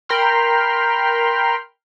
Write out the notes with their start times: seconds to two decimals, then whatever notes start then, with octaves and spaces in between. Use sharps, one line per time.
0.09 A#4 G5 B5 C6 F6